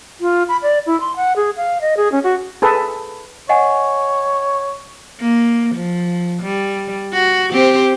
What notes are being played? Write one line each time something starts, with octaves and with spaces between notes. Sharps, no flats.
F4
B5
D5
E4
C6
F#5
G#4
F5
D#5
G#4
C#4
F#4
G#4 A4 B4
C#5 D#5 F#5 G#5
A#3
F3
G3
F#4
C4 G4 C5